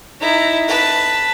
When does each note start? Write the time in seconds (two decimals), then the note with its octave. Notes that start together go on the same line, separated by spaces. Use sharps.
0.21 D#4 E4
0.68 B4 A5